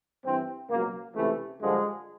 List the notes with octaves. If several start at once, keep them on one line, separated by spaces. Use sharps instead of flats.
G2 E3 C4
C#2 B2 F#3 A#3
C#2 C3 E3 A3
G2 D3 F3 G#3